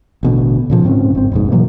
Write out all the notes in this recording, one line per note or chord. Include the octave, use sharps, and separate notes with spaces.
A1 B2 D3
A#2 C#3 F3
G#2 C4 C#4
G1 C4
F1 A#1 G#2
B2 E3 F#3 A#3